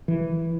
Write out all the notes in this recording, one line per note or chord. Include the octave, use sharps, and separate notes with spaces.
E3